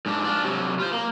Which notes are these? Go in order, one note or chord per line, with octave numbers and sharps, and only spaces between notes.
G#2 D4
D4 F4
C3 F#3
F4 C5
A#3